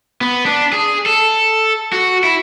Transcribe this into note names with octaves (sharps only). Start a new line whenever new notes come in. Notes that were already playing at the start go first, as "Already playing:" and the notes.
B3
D4
G#4
A4
F#4
E4